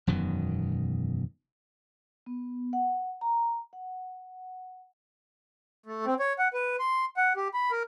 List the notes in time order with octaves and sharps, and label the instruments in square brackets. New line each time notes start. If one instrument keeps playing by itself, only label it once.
[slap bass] E1 F#2 B2 D#3
[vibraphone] B3
F#5
A#5
F#5
[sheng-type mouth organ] A3
C4
C#5
F#5
B4
C6
F#5
G4
B5
A#4